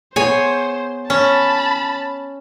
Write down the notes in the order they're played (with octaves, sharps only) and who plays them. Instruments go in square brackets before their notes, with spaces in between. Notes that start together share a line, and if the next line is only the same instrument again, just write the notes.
[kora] B3 G#4 [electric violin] C5 [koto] C#5 G#5
[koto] C#4 [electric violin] A5 B5